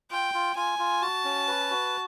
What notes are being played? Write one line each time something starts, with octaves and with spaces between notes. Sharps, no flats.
F4 G5
F4
F4 G#5
F4
F#4 A5
C#4
B4
F#4